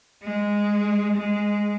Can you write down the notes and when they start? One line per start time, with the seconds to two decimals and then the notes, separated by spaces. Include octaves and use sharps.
0.23 G#3
1.17 G#3